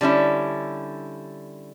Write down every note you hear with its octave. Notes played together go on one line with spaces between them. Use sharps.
D3 G3 C#4 E4